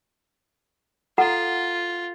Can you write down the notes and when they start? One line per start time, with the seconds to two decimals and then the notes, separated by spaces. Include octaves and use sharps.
1.18 F4 A4 F#5 A#5